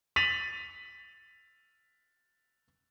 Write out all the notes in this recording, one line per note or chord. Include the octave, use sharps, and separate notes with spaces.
A6 B6 D#7 F7 F#7